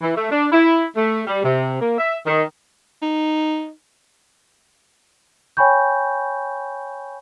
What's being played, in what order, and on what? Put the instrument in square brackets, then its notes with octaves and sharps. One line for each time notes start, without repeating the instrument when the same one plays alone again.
[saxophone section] E3
A3
D4
E4
A3
G3
C3
A#3
E5
D#3
[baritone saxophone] D#4
[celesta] C#5 G5 G#5 B5 C#6 G6